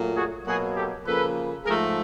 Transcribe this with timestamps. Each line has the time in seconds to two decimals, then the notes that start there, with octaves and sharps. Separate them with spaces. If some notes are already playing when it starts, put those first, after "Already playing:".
Already playing: A#2 F#3 A3
0.16 F#4 G#4
0.46 B2 F#3 A#3 F#4 G#4
0.75 G4 A4
1.05 C#3 F3 A#3 A4 B4
1.65 G#2 F3 A3 G#4 A#4